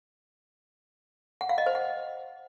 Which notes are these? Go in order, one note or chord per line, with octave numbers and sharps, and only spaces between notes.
F#5
F5
D#5
C5
F#5